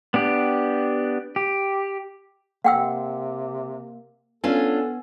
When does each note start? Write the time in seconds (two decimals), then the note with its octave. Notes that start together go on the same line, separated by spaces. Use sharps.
0.14 B3 D4 G4
1.36 G4
2.64 C3 A#3 F#5 G5 E6
4.44 B3 C#4 D4 F4 A4 G#5